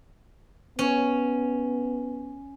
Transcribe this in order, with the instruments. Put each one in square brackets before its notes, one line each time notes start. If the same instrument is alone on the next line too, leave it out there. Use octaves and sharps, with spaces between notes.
[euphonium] B3 [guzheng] C#4